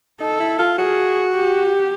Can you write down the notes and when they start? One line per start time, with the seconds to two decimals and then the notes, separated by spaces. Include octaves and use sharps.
0.20 D#4 A4
0.40 E4
0.59 F4
0.78 F#4 G#4
1.34 G4